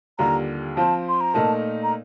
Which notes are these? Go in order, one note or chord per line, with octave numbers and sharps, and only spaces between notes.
D#2 D3 G3 A#3 F4 A#5
F3 C4 F4 C5 A5
C6
A#5
A#2 A3 D#4 A#4 A5
A#5